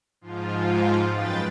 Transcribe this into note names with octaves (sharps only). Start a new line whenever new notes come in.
G#2 F3 F4
F#2 G#3 B4 G5 A6